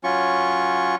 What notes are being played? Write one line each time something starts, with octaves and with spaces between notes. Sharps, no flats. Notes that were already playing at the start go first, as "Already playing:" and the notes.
F#3 C#4 F4 C#6